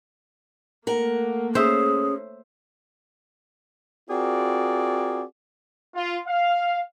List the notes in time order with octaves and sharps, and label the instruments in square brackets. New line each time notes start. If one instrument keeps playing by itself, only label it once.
[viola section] A3 A#3 [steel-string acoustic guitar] A#4 F#5
[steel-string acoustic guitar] C#4 [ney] G#4 [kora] C5 E5
[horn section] C4 F4 F#4 G#4 A#4 D5
[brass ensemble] F4
F5